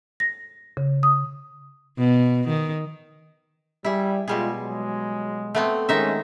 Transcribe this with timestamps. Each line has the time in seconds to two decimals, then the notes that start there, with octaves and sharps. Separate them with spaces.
0.20 A#6
0.77 C#3
1.03 D#6
1.98 B2
2.49 D#3
3.85 G3 E4 G#4
4.28 B2 G3 G#3 F4 G#4
4.58 F#3 G#3
5.55 A3 B3 C4
5.89 D#3 G#3 A3 C#4 D#4 E5